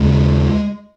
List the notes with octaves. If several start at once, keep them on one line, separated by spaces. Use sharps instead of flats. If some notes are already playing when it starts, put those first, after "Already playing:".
Already playing: D#2 C#3 G#3